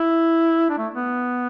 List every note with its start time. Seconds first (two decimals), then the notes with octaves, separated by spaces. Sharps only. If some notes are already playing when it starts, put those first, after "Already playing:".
Already playing: E4
0.70 D4
0.78 A3
0.94 B3